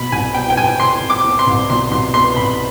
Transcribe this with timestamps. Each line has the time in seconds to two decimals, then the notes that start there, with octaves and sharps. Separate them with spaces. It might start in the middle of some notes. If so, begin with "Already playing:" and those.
Already playing: B2 B5
0.12 C2 G#5
0.34 B3 G5
0.50 G5
0.57 C2 G#5
0.80 B2 C6
1.02 C2
1.10 D6
1.24 B3
1.39 C6
1.47 C2
1.69 B2 C6
1.91 C2 C6
2.14 B3 C6
2.36 C2 B5